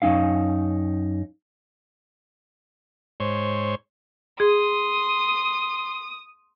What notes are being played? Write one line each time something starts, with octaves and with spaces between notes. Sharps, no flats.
F#2 C#4 D#4 F5
G#2 C5 C#5
G#4 C6 D#6